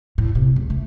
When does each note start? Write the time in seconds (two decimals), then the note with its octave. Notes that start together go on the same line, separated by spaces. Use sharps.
0.18 A2
0.35 C3
0.56 C#2
0.70 A3